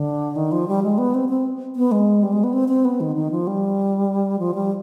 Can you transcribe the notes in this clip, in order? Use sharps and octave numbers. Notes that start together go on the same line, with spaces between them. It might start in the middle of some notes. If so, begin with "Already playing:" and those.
Already playing: D3
D#3
F3
G3
G#3
B3
C4
C4
B3
G#3
G3
G#3
B3
C4
C4
B3
D#3
D#3
F3
G3
F3
G3